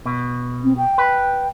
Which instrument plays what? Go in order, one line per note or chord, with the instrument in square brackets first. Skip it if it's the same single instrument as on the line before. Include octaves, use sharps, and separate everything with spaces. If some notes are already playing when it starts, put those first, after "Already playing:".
[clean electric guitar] B2
[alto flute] C4
G5
[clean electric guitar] B4